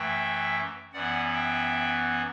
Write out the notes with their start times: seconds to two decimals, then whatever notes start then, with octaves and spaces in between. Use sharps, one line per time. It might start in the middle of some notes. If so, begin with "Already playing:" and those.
Already playing: F#2 E3 A3 E5 G5
0.93 F#2 E3 B3 D5 F#5
1.34 E5 G5